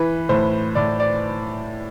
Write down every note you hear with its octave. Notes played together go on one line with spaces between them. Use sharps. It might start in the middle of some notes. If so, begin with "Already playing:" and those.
Already playing: E3 B4
A2 C5
A2 D5
D5